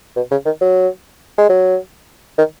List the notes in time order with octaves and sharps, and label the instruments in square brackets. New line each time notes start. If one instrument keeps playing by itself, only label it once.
[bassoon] B2
C#3
D#3
F#3
G#3
F#3
D#3